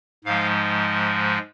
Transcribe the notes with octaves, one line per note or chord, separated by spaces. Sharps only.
G#2 F3 G#3 F5